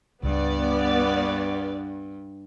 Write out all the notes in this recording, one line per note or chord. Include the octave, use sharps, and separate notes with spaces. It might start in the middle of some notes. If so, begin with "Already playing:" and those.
C#2 G2 B3 D5